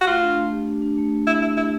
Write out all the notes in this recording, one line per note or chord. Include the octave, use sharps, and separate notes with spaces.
F#4
A3 F4
D4
A3
G4
D4
D4
A3
A3
A3 E4
A3 E4
E4 G4